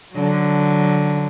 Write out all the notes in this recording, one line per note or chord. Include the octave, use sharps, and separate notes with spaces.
D3 F#3